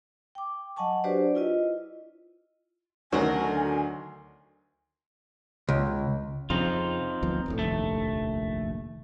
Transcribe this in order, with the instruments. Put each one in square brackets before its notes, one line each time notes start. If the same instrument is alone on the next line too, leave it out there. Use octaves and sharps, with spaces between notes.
[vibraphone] G5 D6
F#3 D#5 F#5 G#5 A5 C#6
D4 F#4 G4 B4 C5 D5
E4 F4 D#5
[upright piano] D2 D#3 F#3 [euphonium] C#4 [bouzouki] F#4 A#4 [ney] G#5
[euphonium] D3
[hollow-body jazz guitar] C#2
[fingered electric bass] F2 C#3 F3 [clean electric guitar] C4 D#4 F4
[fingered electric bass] D2 F3 B3
D#1 A#1 A2
[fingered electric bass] F1 A#1 D#2 [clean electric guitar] A3